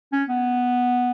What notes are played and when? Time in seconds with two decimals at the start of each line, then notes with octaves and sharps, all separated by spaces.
0.12 C#4
0.29 B3